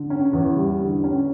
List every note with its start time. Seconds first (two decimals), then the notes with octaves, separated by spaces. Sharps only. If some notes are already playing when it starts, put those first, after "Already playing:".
Already playing: D3
0.10 C#4
0.33 E2
0.56 G3
0.80 D3
1.04 C#4